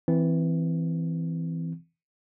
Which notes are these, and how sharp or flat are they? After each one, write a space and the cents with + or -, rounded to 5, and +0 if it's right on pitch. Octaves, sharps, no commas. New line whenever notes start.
E3 +0 C4 -15